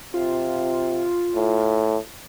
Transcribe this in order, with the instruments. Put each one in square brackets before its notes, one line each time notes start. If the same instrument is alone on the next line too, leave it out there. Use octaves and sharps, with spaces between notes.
[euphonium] C3 [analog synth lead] F4
[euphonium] A2